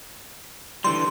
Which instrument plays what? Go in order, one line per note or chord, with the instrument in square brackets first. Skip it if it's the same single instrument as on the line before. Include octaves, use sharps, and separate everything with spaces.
[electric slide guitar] D3 E3 G3 [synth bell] C6